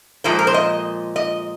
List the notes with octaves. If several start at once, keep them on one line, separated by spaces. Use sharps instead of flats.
A#2 F3 G#3 C5
A#4
C5
D#5
D#5